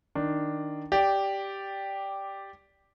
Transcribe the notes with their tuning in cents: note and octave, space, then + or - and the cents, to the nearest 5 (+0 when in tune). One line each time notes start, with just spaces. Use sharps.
D#3 -5 D4 +0
G4 +0 D5 -10